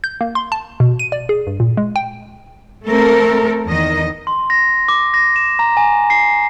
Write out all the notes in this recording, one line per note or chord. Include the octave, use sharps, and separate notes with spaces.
G6
A#3
C6
A5
B2
D#7
D5
G#4
G2
A#2
G#3
G5
A3 C4 A4 A#4
E2 D#3 D#5
C6
A#6
D6
A#6
E7
A#5
G#5
C7